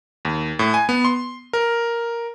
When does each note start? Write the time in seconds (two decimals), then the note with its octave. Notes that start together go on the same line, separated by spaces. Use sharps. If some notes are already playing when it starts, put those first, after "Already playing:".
0.25 D#2
0.59 A2
0.74 G#5
0.89 B3
1.05 C6
1.53 A#4